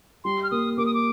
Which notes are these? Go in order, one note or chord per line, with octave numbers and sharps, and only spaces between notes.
G3 C6
F6
A#3 D#6
A#3 D6
D#6
D6